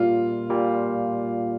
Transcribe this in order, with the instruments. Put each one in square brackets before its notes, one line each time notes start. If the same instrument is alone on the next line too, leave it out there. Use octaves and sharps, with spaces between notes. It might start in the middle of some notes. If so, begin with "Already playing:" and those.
Already playing: [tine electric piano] A#2 G3 A#3 [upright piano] F4
[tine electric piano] A#2 G3 A#3